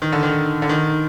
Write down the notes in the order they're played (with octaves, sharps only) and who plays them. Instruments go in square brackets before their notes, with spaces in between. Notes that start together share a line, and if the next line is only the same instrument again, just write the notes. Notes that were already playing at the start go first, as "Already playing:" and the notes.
[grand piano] D#3
D3
D#3
D3
D#3